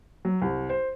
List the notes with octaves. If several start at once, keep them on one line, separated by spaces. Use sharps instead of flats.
F#3
C2
C5